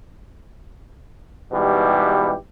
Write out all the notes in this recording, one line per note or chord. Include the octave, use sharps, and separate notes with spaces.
G#2 B2 E3 G3 G4